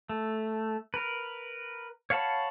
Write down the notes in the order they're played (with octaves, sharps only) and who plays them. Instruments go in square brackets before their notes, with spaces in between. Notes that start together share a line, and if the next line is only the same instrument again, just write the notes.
[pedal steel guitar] A3
A#4 B4
C#5 F5 F#5 A5 B5